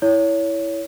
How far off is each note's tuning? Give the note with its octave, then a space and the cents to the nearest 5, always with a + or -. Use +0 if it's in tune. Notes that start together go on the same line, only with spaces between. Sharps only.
E4 +0 C#5 +20